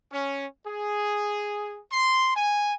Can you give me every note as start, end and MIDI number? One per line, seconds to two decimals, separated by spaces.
0.12 0.45 61
0.66 1.80 68
1.92 2.30 84
2.35 2.73 80